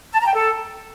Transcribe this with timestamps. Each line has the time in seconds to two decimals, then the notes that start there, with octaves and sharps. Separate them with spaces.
0.13 A5
0.20 A#5
0.27 G5
0.35 A4